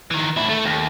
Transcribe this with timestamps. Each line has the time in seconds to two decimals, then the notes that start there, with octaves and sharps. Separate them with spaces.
0.11 D#3 E3
0.37 D2 E4
0.49 A3 A4
0.65 D#2